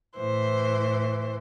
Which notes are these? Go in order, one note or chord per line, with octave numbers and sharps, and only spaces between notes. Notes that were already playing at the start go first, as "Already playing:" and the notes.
A2 E3 C5